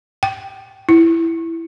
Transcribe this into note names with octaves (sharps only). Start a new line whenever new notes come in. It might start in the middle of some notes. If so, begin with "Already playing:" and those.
G5
E4